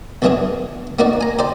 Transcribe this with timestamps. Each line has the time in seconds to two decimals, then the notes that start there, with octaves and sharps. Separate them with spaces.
0.22 B1 E2 E3 B3 D4 G#4
0.99 A#3 B3 D#4 F#4 D5
1.21 G#5 A#5
1.39 G4 C5 D5